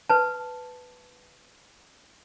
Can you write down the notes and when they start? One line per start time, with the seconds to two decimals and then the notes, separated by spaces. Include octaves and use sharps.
0.10 B4 A5